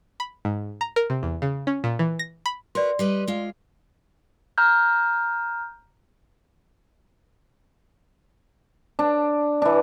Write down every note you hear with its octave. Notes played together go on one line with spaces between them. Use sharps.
B5
G#2
A#5
A#4
C3
E2
C#3
C#4
A#2
E3
A#6
B5
F#4 A#4 B4 D5 C6
G3 B4 D#5
G#3 F4
A#5 F6 G6
D4
E3 D4